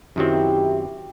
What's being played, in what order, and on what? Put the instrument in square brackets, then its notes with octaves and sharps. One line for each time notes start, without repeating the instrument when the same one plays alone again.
[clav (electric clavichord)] F#2 D#3 F#3 C4 [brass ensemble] E4 G4